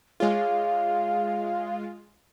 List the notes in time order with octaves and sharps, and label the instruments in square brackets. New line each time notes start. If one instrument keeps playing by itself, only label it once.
[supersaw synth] G#3 F4 [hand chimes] G#4 C#5 [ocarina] F5